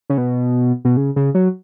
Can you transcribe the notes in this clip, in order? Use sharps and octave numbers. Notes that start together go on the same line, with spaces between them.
C#3
B2
B2
C#3
C#3
F#3